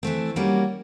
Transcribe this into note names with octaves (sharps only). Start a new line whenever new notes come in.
E3 A3 C4
G3 A#3 C#4 F#4